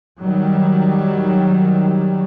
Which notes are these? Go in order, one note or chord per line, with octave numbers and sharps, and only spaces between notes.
D#3 F#3 G3